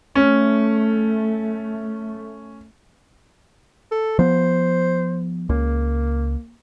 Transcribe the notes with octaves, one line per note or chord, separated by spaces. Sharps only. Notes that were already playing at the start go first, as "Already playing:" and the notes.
A3 C#4
A4
F3 B3 C5
C#2 A#3